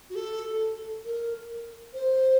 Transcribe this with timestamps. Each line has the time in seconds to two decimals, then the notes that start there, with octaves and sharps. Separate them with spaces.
0.10 F#4
0.15 A4
1.05 A#4
1.94 C5